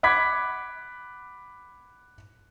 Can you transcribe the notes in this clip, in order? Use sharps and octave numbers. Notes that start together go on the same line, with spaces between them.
F#5 B5 D6 F#6 G#6 B6